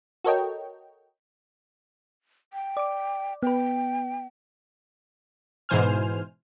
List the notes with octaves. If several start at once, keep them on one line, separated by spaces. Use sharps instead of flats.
F#4 A4 A#4 C#5 D#5 G5
G5
D5 D6
B3 B4 G5
G#2 B2 E3 C5 G#5 F6